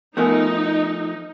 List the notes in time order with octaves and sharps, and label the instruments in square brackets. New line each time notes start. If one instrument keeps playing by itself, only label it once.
[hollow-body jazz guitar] F3 A3 [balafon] B3 A#4 G#5 [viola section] D#4